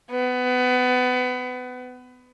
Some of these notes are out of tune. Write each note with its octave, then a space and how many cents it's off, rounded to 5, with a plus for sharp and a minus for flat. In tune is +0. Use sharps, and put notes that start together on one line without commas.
B3 +25